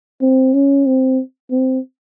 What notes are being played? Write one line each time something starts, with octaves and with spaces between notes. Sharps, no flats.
C4
C#4
C4
C4